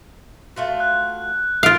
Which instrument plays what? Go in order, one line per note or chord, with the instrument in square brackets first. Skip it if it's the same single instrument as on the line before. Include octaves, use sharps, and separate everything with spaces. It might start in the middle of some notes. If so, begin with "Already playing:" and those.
[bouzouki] A3 F4 F#4
[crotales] F#6
[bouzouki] D#3 [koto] F4 F5 [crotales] F6 D7